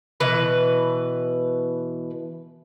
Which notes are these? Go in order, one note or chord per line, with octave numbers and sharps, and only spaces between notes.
B2 E3 B4